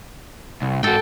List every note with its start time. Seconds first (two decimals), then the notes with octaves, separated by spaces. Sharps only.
0.62 C2
0.83 G#2 F#4 A4 G5